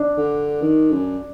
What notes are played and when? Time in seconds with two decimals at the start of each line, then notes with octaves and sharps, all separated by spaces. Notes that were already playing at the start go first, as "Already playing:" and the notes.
Already playing: D4
0.17 D3
0.62 D#3
0.92 F#2